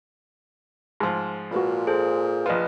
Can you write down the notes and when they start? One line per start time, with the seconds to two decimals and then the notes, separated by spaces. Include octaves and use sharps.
1.00 G#2 F3
1.51 A#2 F#4 B4 B5
1.87 G#4 A4 C5
2.46 A#1 F4 B4 D#5